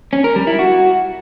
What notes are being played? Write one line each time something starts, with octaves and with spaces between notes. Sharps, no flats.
C#4
A#4
G3
E4
F#4